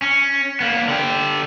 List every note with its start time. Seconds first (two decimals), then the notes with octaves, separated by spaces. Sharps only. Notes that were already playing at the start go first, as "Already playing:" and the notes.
0.02 C#4
0.60 A#3 B3
0.88 D3 G4